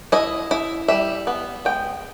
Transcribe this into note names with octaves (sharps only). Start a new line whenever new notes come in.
E4 D#5
E4
G3 E5
B3
G#3 G5